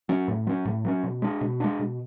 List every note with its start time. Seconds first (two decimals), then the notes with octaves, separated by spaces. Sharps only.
0.09 F#3 C#4
0.28 A2
0.47 F#3 C#4
0.65 A2
0.85 F#3 C#4
1.03 B2
1.22 G#3 D4
1.41 B2
1.60 G#3 D4
1.79 B2